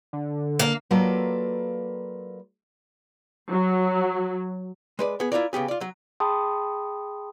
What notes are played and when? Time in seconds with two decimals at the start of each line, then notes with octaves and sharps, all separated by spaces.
0.13 D3
0.59 A#3
0.91 F#3 A#3 F4 A4 B4 D5
3.51 F#3
4.99 G#3 B4 D5
5.20 B3 G#4
5.32 E4 F4 A#4 D5
5.53 C#3 B3 G4 G#4
5.68 F4 D5
5.81 F#3
6.20 G#4 G5 A5 B5 C6 D#6